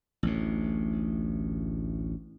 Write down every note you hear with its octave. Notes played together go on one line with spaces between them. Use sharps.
A1 D2 A2